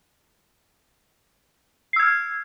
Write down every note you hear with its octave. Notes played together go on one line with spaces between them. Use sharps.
E6 F6 G#6 C7